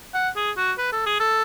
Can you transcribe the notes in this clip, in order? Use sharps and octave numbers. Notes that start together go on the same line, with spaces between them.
F#5
G#4
F#4
B4
A4
G#4
A4